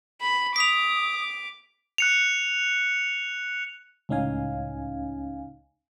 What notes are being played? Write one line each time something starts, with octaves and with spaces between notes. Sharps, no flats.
B5
D6 D#6 B6 F7
F#6 C#7 F7
C#2 A2 C#4 D#4 F5 G#5